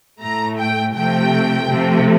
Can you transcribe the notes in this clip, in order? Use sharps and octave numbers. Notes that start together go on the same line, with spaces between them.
A2 A3 A#5
G5
C3 F3 A3 G5
C3 F3 A3